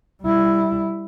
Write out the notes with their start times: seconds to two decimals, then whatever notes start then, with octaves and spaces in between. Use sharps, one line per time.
0.23 G3 E4